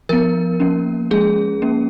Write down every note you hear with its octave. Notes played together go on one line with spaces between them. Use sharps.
F3 B3 A#4
F3 A#3 C#4
F3 G#3 C#4 G#4
F3 A#3 C#4